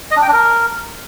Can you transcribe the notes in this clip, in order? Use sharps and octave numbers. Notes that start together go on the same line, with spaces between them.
D#5
D4
G5
D4
A#4